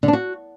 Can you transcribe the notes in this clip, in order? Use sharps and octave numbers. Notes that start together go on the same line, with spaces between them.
D3
D4
F#4